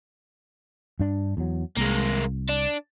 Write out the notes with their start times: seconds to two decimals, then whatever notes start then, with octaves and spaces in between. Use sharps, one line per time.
1.00 G2 D4
1.37 E2 F#3
1.77 C2 G#3 A#3
2.49 D4